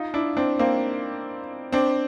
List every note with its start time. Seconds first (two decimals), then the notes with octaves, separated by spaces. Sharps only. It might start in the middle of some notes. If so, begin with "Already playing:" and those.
Already playing: D#4 F4
0.14 D4 E4
0.37 C4 D4
0.59 A#3 C4
1.72 C4 D4